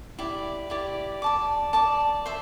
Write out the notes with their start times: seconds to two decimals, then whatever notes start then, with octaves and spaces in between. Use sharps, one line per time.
0.19 E4 G4 D5
0.70 E4 G4 D5
1.22 D5 A5 D6
1.73 D5 A5 D6
2.26 C5 E5